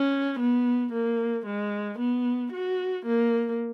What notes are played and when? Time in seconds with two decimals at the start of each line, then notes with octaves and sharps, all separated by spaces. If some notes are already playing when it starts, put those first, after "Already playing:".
Already playing: C#4
0.39 B3
0.93 A#3
1.46 G#3
1.99 B3
2.52 F#4
3.06 A#3